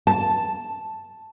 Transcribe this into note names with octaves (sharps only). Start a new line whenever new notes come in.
A5